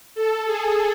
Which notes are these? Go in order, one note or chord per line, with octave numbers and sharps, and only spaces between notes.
A4
G#4